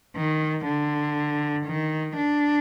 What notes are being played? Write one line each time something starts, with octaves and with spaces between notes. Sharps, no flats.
D#3
D3
D#3
D4